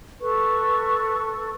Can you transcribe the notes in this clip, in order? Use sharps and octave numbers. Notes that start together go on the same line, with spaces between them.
A4 B4 C#6